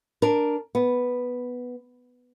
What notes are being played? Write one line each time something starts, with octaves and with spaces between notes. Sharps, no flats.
D4 A#4
B3